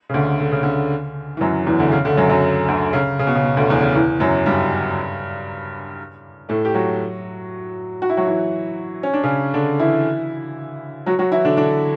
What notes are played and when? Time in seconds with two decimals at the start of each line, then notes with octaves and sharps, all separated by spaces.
0.09 C#3
0.14 D2 D3
0.39 D3
0.52 C#3
0.63 D2 D3
1.37 E3
1.41 F#2 F#3
1.67 E2 E3
1.79 D2 D3
1.92 C#3
2.05 D2 D3
2.17 F#2 F#3
2.30 F#2 F#3
2.68 D2 D3
2.93 C#3
3.19 C#3
3.27 B2
3.35 C#3
3.44 B2
3.57 D2 D3
3.70 E2 E3
3.82 C#3
3.95 E2 E3
4.20 F#2 F#3
4.46 G2 G3
6.49 A2 A3
6.65 G4
6.74 F#3 F#4
8.02 F#4
8.09 E4
8.17 F#3 F#4
8.27 E3 E4
9.03 C#4
9.13 D4
9.24 C#3 C#4
9.54 D3 D4
9.79 E3 E4
11.06 F#3 F#4
11.19 F#3 F#4
11.32 E3 E4
11.45 D3 D4
11.57 D3 D4